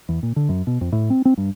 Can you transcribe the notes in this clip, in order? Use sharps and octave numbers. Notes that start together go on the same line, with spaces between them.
E2
A#2
D3
F#2
B2
F2
A2
C4
C4
G2